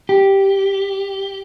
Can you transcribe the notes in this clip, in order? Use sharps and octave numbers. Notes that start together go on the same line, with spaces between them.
G4